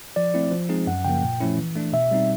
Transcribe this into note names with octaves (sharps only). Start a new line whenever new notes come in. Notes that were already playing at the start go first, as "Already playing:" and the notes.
F3 D5
A3 C4 E4
F3
G#3 C4 D#4 G#4
F#2 F#5
C#3 F3 A#3 G5
A#2
F3 A3 C#4 E4
E3
A3 D4
B2 E5
G3 C4 D#4